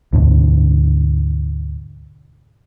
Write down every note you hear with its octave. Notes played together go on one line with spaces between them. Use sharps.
D2 G#2 B2 D3